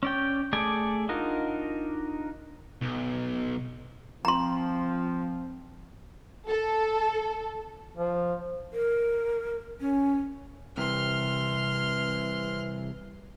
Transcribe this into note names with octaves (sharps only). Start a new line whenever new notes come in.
C#4 D5 G5
A3 G#4 A4 D5 G#5
D4 D#4 F4 F#4 A#4
B1
F3 C4 A#5 C6
A4
F3
A#4
C#4
C2 C3 E3 C6 F6